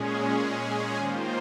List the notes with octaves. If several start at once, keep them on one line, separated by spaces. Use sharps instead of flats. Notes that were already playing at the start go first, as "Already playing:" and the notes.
Already playing: A#2 G#3 C#4 G#4
D#3 A#3 F4 C5